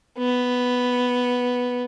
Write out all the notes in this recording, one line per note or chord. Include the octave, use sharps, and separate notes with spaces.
B3